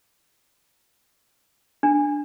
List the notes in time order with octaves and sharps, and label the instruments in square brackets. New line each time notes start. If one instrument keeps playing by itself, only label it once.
[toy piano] D4